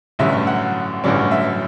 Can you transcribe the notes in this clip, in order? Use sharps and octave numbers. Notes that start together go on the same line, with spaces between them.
A1 G2 D3 F#3 C#4 E5
F#5
A1 G2 D3 F#3 C#4 D5
E5